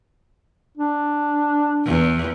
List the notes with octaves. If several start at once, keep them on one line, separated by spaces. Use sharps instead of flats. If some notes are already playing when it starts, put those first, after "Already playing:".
D4
E2